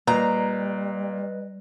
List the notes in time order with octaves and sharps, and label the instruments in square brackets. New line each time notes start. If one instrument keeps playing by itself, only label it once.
[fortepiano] A#2 [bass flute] G3 [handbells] B4 D#5 [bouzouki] A#5